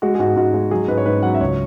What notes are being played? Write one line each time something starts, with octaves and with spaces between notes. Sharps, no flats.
G#3 F#4
G#4
G#2 F#4
G#2 F#4
G#3
F#3 G#4
G#2 B4
C#5
G#2 B4
F#3 F#5
E5
C#2 C#5